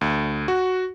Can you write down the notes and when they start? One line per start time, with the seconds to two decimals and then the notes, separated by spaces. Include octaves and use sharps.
0.01 D2
0.48 F#4